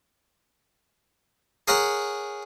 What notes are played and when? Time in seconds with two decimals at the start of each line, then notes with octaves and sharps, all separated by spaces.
1.68 G#4 A#4 C#5 F#5 A#5